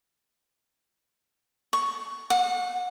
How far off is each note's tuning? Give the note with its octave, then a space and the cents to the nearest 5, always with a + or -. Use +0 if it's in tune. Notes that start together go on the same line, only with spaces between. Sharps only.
C#6 +5
F#5 -35